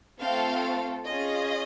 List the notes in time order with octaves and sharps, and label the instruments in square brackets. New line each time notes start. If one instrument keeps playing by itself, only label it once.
[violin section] A3 C4 F4 A4 F5
C#4 F4 G#4 D#5